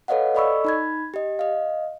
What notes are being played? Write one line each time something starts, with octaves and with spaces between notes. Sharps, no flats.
A4 B4 C#5 D#5 F5 F#5
A4 D5 D#5 B5 C#6 E6
D#4 B5 G#6
G4 D#5
D#5 F5